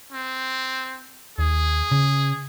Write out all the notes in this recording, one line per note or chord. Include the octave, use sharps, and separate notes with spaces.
C4
D#2 G#4
C#3